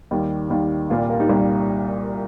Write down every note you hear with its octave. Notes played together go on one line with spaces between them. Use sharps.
D#2 D#3 G3
D#2 D#3 G3
C2 A#2 G3 F4
F4 A#4
D#4 G4
C2 A#2 G3